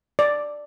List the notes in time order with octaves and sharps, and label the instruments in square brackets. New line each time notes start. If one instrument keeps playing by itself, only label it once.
[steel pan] D5